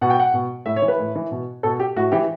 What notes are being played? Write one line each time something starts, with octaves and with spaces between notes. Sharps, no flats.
B2 F#5
G5
F#5
B2
A2 E5
C#5
E3
B4
A2
E3
B2
B2 A4
G4
A2 F#4
E3 G4